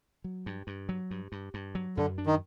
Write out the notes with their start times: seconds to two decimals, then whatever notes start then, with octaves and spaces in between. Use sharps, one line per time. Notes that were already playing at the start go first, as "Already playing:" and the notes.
0.24 F#3
0.46 G2
0.67 G2
0.89 F#3
1.11 G2
1.32 G2
1.54 G2
1.75 F#3
1.97 F#2 D3
2.18 D4
2.26 D#3